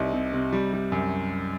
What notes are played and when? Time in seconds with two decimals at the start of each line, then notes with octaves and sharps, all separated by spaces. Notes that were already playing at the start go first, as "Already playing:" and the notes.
Already playing: C2 C3 D#4
0.13 C3
0.33 C3
0.53 G3
0.73 G3
0.92 F#2